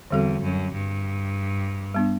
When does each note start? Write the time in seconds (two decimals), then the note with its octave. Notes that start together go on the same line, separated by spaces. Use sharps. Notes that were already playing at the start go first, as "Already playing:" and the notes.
0.11 E2 D3 G3 C4 F#4 A4
0.41 F#2
0.73 G2
1.94 G3 B3 D4